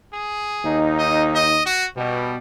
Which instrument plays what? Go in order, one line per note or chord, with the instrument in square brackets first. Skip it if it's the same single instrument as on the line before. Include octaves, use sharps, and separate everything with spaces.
[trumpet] G#4
[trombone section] D#2 D#4
[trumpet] D#5
D#5
F#4
[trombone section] B2 [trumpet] G3